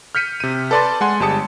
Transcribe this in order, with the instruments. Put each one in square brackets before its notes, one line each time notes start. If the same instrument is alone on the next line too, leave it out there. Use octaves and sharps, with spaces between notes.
[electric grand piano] F6 G6 B6 C#7 D#7
C3 D#7
A4 B4 D5 A5 C6 A6
G#3 F#5 G#5 C6
G1 G#3 G4 A5 D#6 C#7